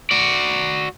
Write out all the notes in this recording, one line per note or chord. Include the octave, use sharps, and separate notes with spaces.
F#4 D5